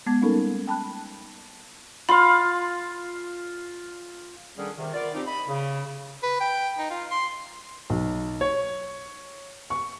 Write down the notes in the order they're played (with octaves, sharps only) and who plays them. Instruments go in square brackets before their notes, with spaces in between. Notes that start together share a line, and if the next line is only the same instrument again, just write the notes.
[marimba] G#3 B3 D6 G#6
G3 A#3 C#4 D#4 A4 A#4
G5 A5 B5 F#6
[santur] F4 F5 [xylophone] B5 C6
[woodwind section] D3 D#3 G3 C#4 D4 G#4
C3 D#3
B3 F4 A#4 D5
F3 C4 D#4 G4
D#5 B5
C#3
[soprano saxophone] B4
G5
D#4
F4
C6
[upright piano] B1
C#5
C#6